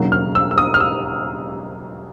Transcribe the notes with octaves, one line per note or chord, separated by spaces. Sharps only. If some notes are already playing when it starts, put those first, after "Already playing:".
Already playing: E1 D#2 C#3 F#3
F6
E6
E6
D#6
F6
E6